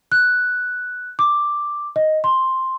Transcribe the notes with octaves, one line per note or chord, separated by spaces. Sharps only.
F#6
D6
D#5
C6